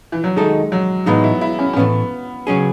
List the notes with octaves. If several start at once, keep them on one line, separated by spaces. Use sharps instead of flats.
E3
F#3
D#3 G#3 A3 D#4 F#4 A4
F#3
A2 E3 G#3 B3 D#4
E4
E4
C#4
C#4
A2 E3 A3 B3
C#3 F#3 C#4 G#4